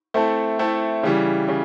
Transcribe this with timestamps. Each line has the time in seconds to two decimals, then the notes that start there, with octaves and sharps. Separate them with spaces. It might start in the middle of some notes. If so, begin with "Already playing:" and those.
0.14 A3 C4 E4 A4
0.59 A3 C4 E4 A4
1.03 C#3 E3 G3
1.48 C#3